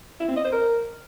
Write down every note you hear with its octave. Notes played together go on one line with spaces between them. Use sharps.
E4
C4
D#5
C5
A#4